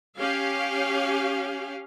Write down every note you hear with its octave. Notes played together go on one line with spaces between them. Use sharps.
C#4 G4 F5